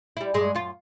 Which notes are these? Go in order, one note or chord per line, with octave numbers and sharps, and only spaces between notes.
G3 E4
G2 G#3
F#2 F4